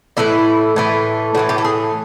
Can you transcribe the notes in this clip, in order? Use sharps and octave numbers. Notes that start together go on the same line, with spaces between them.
A2 E3 A3 E4
A2 E3 A3
A2 E3 A3 F#4
G4
A4
G#4